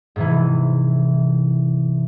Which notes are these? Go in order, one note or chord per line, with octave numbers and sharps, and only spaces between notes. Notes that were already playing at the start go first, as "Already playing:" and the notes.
G#2 C3 E3